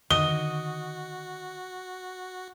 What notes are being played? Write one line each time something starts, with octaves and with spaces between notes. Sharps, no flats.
D3 D#3 F#4 D#5 G7